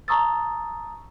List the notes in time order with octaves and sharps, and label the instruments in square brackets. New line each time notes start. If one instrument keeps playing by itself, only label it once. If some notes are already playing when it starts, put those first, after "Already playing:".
[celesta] A5 A#5 C#6 D#6 E6 A6